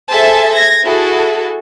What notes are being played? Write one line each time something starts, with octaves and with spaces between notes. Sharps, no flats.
G#4 A4 C5 E5 G#5 A5
G#6 A#6
E4 F#4 G#4 A4